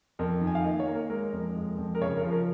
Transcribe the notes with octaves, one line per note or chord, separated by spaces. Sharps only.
F2 A#4
D#3
G#5
F5
A#3 D#5
C#5
A#3
A#4
G#3 A#4
F2
G#3
F2
A#4
C#3 C#5
A#4
F3
A#4